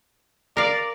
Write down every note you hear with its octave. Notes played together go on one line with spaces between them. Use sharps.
A#4 D5 F5